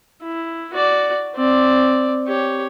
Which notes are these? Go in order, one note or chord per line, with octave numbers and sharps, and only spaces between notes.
E4
F#4 D5
C4 D5
G4 C#5